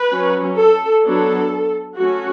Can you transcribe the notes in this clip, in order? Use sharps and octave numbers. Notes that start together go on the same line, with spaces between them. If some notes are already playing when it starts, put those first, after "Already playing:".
Already playing: B4
F#3 C#4
A4
F#3 B3 D4 A4
F#3 A3 C#4 F#4